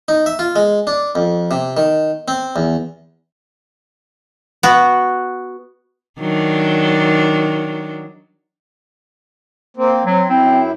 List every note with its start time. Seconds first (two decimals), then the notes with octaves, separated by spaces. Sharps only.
0.08 D#4
0.26 E5
0.39 F4
0.56 G#3
0.87 D4
1.15 F2
1.51 C3
1.77 D#3
2.28 C4
2.56 E2
4.63 B3 F#4
6.19 D#3 F#3 D4
9.77 A#3 C4
10.05 F#3 C4
10.29 F#2 C4 E4